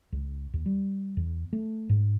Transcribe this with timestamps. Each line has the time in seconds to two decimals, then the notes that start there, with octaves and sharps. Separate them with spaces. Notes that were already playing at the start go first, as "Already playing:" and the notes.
0.12 C#2
0.54 D#2
0.66 G3
1.17 E2
1.53 A3
1.89 G#2